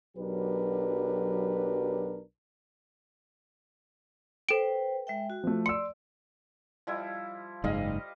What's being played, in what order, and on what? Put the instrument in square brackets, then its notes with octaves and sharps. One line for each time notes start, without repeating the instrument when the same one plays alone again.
[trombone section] B1 F#3 D4 G4 A#4 B4
[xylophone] A4 D7 [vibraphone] B4 C5 G5
[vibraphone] G#3 E5 G5
F#4
[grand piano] F3 A3
[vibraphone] D5 [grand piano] C6 E6 [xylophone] C#7
[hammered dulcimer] F3 G3 E4
[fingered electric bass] F#1 G#2 [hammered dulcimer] G3 D#5 F5